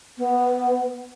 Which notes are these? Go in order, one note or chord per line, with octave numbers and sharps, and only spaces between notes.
B3